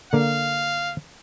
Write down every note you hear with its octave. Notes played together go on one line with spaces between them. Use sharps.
D3 A#3 F5